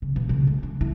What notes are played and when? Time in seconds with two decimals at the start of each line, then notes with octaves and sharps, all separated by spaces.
0.02 C#3
0.16 B2
0.29 C#3
0.47 G#3
0.63 D4
0.81 E4